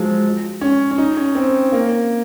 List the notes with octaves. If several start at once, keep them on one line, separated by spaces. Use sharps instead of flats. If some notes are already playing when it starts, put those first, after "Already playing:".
Already playing: F3 F#3 G#3
C#4
C#4
D#4
C#4
C4
A#3